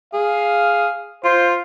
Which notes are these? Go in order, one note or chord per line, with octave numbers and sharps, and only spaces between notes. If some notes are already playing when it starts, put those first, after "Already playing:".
G#4 F5
F4 C5